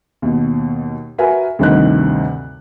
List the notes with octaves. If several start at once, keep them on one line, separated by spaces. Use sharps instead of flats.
D#2 B2
F#4 A#4 B4 E5 G#5
D2 G2 C3 D#3 D#4 F#6